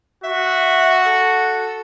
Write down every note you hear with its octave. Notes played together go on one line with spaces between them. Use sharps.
F#4 E5
A4